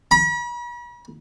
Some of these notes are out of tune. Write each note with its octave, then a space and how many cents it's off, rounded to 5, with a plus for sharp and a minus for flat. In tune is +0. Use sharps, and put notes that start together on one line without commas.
B5 -45